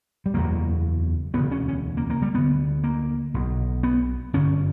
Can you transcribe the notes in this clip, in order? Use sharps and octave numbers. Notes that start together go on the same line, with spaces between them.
G3
F#1 E2 B2 A#3
E1 D2 C#3 B3
C#4
C#4
A#3
A#3
G3
D2 D3 B3
A#3
B1 B2
B3
G1 F#2 D3 C#4